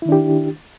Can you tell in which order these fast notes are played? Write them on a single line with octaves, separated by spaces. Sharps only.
E4 D#3 D4 G4